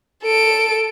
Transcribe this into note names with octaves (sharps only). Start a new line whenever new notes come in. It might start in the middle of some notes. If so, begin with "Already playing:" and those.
A4 D7